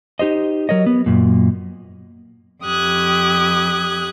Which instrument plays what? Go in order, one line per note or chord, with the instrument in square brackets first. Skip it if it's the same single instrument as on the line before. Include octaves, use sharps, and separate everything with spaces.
[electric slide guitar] D#4 G4 C5 D#5
F#3 A#4 C#5 D#5
B3
F#2 A#2
[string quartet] F2 G4 D#6 F#6 G#6